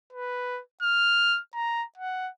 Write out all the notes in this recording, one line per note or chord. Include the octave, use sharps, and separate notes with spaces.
B4
F6
A#5
F#5